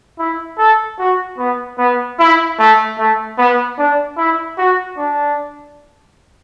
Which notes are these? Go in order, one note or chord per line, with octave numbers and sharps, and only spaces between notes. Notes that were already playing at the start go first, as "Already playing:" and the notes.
E4
A4
F#4
B3
B3
E4
A3
A3
B3
D4
E4
F#4
D4